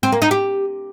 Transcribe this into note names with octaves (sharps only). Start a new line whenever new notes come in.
C4
A#3
D#4
G4